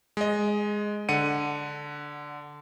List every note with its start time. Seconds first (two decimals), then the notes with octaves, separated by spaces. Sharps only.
0.17 G#3 D#5
1.09 D3 F#5 C#7 D#7